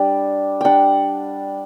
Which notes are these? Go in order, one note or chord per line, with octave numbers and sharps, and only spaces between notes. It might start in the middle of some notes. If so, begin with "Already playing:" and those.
Already playing: G3 D4 D5
G3 D4 F#5 G5